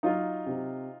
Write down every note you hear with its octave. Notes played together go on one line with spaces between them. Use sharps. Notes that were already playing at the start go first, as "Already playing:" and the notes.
F#3 D#4 F4
C3